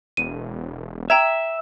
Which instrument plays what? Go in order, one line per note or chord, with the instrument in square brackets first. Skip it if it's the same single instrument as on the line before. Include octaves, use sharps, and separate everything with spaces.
[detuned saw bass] E1 [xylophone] D#7
[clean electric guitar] E5 [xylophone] G5 A#5 G#6